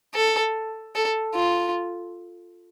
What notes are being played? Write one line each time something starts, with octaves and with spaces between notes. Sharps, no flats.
A4
A4
F4